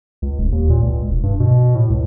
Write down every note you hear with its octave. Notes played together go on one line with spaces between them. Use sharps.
C#2
D#1
D#2
A#2
C#2
E1
G2
B2
A2
C#2